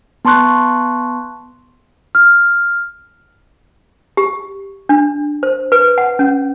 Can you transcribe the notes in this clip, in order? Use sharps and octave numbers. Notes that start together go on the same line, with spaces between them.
B3 A5 C6 C#6 F#6
F6
G4
D4
C5
B4
F#5
C#4